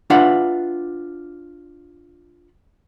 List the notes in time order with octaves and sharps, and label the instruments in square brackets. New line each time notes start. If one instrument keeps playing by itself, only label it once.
[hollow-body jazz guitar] D4 F4 B4 E5 F#5